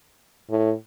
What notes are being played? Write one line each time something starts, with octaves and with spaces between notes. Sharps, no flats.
A2